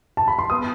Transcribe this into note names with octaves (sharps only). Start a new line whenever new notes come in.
A5
B5
C6
B3 D#6